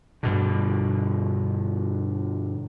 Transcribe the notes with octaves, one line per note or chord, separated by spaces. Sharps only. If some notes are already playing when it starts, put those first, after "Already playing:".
G2 B2 D3